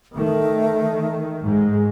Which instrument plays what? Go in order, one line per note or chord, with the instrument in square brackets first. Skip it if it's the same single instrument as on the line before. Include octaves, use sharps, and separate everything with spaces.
[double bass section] D#3 [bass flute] A3
[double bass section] G#2 G#3